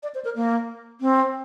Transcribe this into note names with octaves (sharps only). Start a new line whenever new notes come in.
D5
C5
A#4
A#3
C4